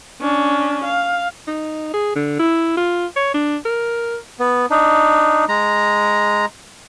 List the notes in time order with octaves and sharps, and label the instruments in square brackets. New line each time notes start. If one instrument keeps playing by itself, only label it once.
[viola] C#4 D4
F5
[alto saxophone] D#4
G#4
D3
E4
F4
C#5
D4
A#4
[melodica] B3
D4 D#4
G#3 A#5